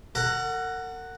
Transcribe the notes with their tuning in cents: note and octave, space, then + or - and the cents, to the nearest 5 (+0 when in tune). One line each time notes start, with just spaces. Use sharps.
A#4 -45 F#5 +0 A#5 +0